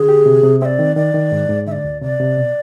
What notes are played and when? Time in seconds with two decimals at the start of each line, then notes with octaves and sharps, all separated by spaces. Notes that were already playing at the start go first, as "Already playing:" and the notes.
Already playing: D3 G#4
0.09 G4
0.26 C3
0.44 C3
0.61 C4 D5 E5
0.79 D#3
0.96 D#3 D5
1.14 D#3
1.32 G#2
1.49 G#2
1.67 D3 E5
1.72 D5
1.84 D2
2.02 C3 D5
2.20 C3
2.37 B2